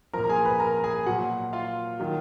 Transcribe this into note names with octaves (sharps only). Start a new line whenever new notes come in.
A#2 F3 A#4 A#5
A#5
G#4 G#5
B4 B5
A#4 A#5
G#4 G#5
A#2 F#3 F#4 F#5
F4 F5
D#3 F#3